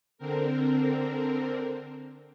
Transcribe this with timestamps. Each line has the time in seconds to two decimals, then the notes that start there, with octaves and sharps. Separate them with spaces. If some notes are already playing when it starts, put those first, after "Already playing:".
0.18 D3 C4 A#4